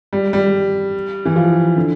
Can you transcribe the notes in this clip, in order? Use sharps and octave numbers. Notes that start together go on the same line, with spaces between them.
G3
G3
E3
F3
D3